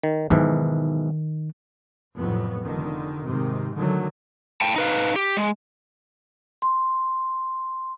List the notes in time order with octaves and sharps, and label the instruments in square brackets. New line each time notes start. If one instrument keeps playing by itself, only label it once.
[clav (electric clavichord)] D#3
[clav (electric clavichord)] B1 G#2 E3 [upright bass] D#3
[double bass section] F1 F2 A2 F#3 B3
F1 D3 D#3
G#2 C3 D#3
D3 D#3 F#3 A3
[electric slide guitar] A2 G5 A5
D#4 B4 F5
G4
G#3
[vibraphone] C6